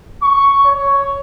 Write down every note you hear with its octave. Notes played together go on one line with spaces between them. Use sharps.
C#6
C#5